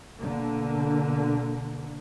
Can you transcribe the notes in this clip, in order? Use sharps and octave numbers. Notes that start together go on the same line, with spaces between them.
B2 D3 A#3